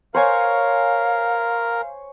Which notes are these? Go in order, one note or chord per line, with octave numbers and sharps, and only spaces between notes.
A#4 C5 C#5 F5 G#5